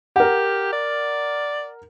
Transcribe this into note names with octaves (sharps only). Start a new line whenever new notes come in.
G4 A#4 F#5
D5